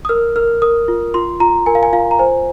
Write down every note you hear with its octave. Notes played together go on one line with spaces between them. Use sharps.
D#6
A#4 F6
A#4 F6
A#4 D#6
F4
F4 C6
F4 A#5
A#4 G#5
F5
G#5
F4 F5
A#5
C5 G#5